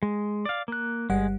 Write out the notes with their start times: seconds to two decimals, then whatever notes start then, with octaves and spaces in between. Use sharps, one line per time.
0.03 G#3
0.45 D5 F5
0.68 A#3 F#6
1.10 G1 G3 G#3 F#5